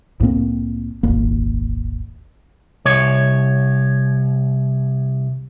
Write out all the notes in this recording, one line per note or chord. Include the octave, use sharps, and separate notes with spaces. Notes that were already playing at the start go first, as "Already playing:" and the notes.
C2 A2 A#3 C4
D#1 G#1 D#2 A#3
C2 C#5